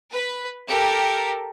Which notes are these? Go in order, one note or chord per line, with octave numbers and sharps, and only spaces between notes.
B4
G4 A4 A#4